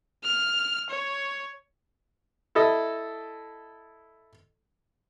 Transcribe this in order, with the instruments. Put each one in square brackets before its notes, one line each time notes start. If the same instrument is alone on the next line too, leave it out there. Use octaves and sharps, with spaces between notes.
[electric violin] F6
C#5
[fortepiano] E4 A4 D#5